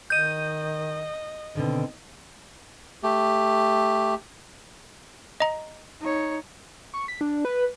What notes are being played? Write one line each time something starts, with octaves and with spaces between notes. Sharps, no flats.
D#3 D#5 G6 D#7
B2 D3 D#3 C4
A3 G4
D#5 A#5
D#4 C#5
C#6
B6
D4
B4